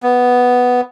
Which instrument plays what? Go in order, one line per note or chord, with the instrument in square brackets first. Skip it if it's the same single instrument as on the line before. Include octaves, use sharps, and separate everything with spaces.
[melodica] B3